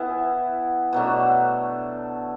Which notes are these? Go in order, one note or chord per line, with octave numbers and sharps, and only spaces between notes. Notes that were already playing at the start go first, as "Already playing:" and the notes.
Already playing: E3 B3 E4
B2 F#3 A3 D4